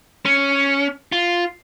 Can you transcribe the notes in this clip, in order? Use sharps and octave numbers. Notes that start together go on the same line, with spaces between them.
C#4
F4